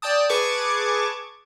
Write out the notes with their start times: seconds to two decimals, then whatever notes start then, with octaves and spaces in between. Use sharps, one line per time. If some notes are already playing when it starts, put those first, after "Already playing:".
0.02 D5 G5 A5 D#6
0.29 G#4 B4 A5 C#6 D6 G#6